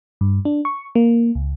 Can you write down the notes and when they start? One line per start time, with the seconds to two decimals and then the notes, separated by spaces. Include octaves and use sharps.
0.21 G2
0.45 D4
0.65 C#6
0.95 A#3
1.35 C#2